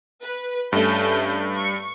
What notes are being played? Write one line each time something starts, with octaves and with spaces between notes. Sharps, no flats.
B4
G2 A3 C#4 G6
C#6